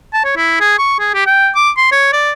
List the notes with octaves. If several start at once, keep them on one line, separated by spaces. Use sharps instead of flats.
A5
C#5
E4
G#4
C#6
G#4
G4
G5
D6
C6
C#5
D5